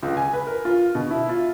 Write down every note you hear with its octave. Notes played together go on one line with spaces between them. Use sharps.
C#2
G#5
B4
A#4
F4
B2
E4
F4